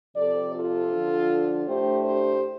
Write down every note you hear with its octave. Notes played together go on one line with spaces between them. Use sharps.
C3 F3 C4 A4 D5
F4 A4
D3 F3 D4
A2 A3 D4 G4 C5
G4 C5